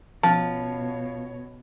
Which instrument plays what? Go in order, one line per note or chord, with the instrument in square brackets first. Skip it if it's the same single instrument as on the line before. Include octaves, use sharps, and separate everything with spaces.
[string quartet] B2 C#5 [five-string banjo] F3 [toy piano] C#4 A5